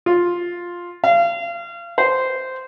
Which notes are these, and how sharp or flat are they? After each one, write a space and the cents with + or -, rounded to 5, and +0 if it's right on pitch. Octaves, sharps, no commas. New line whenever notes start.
F4 +5
F5 -30
C5 -10